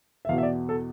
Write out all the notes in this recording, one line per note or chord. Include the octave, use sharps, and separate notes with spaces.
E5
E2 B2 F5
E5
D5
A4